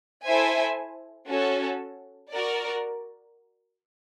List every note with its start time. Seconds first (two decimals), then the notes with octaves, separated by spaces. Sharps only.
0.25 E4 A4 C5 E5 G#5
1.29 C#4 F#4 A4
2.33 F#4 A#4 D5